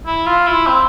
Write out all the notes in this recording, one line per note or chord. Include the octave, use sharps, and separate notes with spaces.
E4
F4
E4
C4